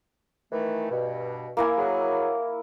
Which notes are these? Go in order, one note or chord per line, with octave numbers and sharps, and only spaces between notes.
D#3 E3 A3
G2 B2
A#3 E4 G#5
F#3 G#4